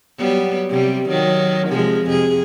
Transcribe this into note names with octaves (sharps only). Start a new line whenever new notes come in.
F#3 G3 B3
C3 G3
D#3 F#3
C3 F3 G#3
F2 C3 G#4